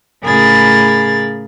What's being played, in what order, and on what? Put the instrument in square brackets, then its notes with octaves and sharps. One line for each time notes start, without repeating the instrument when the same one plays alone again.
[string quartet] A2 C#3 G#4 A#4 B5 A6